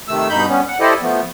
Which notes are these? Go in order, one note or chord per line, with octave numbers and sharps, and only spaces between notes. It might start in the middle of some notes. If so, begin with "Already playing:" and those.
C3 D#3 A3 E6
G2 B2 D#4 B5 G6
G3 B3 C#4
F#5
E4 G4 A4 C5 D5 D#5
F3 A3 B3